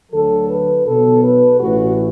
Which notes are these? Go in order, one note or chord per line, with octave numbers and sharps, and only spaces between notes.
D2 D3 F#3 A4
B4
B1 B2 F#3 A4
B4
A1 A2 E3 F#4